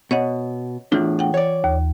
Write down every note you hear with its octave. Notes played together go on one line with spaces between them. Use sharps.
B2 C#5 D#5 F#5
E2 A2 E3 D4 F4
F#5 G5
C#5 D5
D#2